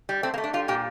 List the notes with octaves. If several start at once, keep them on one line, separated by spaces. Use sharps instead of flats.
G3
A3 C4
A#3
A3
D4
G3 F4
A#2 G4